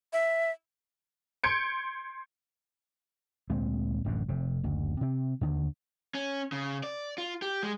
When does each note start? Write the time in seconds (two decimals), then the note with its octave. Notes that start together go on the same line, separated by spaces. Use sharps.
0.13 E5
1.44 C6 G6 G#6 C#7 D7
3.50 D2 A#2 G#3 C4
4.04 D1 A1 F#2 D3
4.29 F1 C3
4.64 F#1 D2
5.01 C3 C4
5.41 D#2 D3 D#3
6.15 C#4
6.52 C#3
6.83 D5
7.18 F4
7.42 G4
7.63 G#3